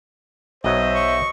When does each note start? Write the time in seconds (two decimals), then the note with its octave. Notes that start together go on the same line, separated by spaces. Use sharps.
0.64 B1 F#3 C5 C#5 D#5 E5
0.95 C#6